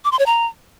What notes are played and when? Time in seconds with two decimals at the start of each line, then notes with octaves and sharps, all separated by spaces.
0.05 D6
0.12 C6
0.19 C#5
0.26 A#5